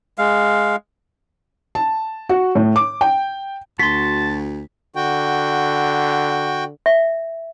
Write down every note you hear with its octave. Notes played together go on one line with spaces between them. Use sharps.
G#3 F5
A5
F#4
A2
D6
G5
D2 F#4 A5 C6 B6
D3 F#4 G5
E5